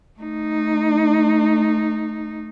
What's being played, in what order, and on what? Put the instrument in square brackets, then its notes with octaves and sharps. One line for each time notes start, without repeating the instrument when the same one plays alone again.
[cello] A3 D#4